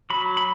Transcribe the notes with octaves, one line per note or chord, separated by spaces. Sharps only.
F#3 B5
B5